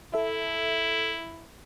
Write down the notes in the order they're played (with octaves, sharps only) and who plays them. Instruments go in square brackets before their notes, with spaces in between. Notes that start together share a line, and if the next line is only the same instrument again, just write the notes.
[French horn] E4 [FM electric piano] A4 E5